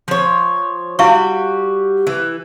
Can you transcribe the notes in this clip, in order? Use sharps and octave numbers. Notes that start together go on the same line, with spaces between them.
F3 C#5
G3 E4 F#4 F5 C#6
E3